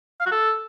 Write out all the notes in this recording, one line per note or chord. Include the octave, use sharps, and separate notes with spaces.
F5
F#4
A4